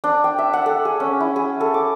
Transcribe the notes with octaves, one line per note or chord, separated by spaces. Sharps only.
D4
G5
E5
F#5
A4
G#4
C#4
E4
G#4
A4
D6